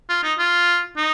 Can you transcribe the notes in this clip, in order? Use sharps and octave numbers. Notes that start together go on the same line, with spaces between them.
F4
D#4
F4
D#4